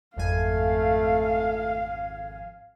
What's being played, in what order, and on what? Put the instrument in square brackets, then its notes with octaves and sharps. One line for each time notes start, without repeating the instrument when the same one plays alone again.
[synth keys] G#1 F2 G#5 [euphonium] A3 [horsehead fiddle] F5